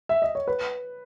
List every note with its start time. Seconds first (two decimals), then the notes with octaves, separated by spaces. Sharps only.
0.09 E5
0.22 D#5
0.35 C#5
0.47 B4